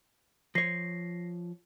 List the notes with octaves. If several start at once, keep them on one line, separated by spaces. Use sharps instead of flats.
F3 C#5 A#6 C7